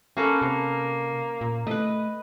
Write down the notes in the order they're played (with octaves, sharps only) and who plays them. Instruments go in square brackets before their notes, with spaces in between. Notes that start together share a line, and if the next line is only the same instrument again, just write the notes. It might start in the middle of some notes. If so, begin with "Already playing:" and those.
[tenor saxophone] A#3 [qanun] C#4 A4 B4
[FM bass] C3 [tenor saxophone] A#3
[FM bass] A#2
[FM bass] A3 [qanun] B4 D#5